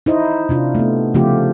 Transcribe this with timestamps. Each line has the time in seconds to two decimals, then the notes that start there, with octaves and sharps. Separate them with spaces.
0.06 D#4 E4 C5 D#5
0.49 C3 D4 F4
0.75 A3 B3
1.14 C#3 F3 A3 C4 F4 G4